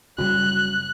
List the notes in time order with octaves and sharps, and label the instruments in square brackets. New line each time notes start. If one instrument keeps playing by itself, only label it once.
[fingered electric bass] F#1 C#3 G3 [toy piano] F#4 [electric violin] F#6